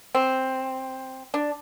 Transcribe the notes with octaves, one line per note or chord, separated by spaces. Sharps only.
C4
D4